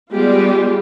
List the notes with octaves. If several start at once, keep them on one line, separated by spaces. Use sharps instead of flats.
G3 G#3 B3 F4 G4